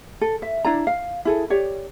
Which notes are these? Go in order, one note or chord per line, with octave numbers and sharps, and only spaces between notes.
A4
E5
D4 E4 D5 A#5
F5
E4 G#4 A4
G4 C#5 D5